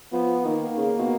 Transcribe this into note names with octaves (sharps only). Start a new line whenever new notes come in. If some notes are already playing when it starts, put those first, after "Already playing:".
F3 B3
D#3 A#3
C#3
B2